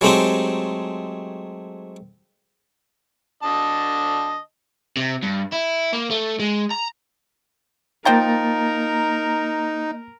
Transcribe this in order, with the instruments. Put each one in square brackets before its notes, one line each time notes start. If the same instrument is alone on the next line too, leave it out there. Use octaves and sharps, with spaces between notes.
[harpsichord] F#3 G#3 A3 C4 D#4 G4
[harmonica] D3 D#5 A5
[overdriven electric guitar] C3
G2
E4
A#3
A3
G#3
A#5
[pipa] F3 G5 A#5 [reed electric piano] A#3 A6 [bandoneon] D#4 [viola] A#4